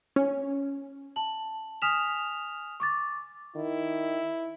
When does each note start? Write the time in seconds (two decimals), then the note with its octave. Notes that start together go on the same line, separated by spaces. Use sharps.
0.16 C#4
1.16 A5 F#7
1.82 G#5 D#6 F6 B6 E7 F7
2.80 C#6 D6 A6
3.56 D#3 E4